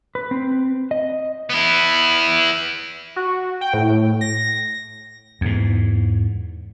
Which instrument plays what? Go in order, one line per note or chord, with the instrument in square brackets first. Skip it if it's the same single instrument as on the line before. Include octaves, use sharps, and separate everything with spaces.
[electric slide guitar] B4
C4
D#5
[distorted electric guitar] B3 E4
[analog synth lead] F#4
G5
A2
A#6
[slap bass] E2 G#2